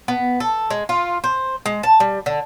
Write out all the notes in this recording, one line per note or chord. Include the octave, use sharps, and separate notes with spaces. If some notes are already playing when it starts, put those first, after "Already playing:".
B3
A4
G#3
F4
C5
G#3
A5
G3
D3